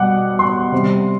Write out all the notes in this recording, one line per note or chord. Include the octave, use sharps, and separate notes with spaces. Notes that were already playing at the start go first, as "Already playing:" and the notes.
Already playing: B2 G3 F#5 D6
C6
C3 G3